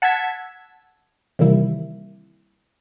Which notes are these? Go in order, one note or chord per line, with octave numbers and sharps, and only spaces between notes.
F#5 A5 E6 G#6 B6
C3 D#3 E3 G3 A#3 E4